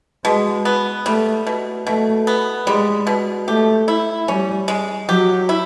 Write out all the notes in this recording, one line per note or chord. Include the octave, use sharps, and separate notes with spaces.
B2 G#3
B3
G3 A3
B2
B2 A3
B3
G3 G#3
B2
A3 G4
E4
G3 C#4
G#3
F#3 G4
E4